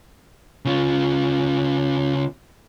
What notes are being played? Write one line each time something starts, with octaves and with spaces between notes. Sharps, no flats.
C#3 F4